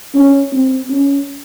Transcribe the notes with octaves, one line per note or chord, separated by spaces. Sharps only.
C#4
C4
C#4